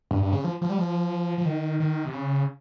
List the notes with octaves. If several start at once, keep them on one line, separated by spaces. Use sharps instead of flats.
G2
G2
C#3
F3
F3
G3
F3
F3
D#3
D#3
C3
C#3